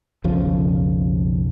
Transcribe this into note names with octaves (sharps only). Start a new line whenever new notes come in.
B1 F2 C#3 F3